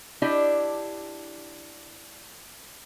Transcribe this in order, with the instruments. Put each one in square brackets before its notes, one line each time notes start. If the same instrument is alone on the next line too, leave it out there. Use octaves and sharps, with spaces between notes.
[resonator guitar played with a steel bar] D4 E4 G4 D#5